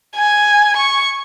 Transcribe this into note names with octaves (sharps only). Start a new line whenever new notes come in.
G#5
C#6